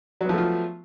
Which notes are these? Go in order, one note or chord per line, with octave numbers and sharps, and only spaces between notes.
F3 F#3 A3 B3 F4